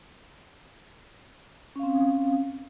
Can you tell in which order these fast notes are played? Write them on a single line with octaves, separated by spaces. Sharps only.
C#4 F5 C4